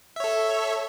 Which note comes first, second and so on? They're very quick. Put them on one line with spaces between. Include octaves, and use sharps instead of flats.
E5 C#5 A4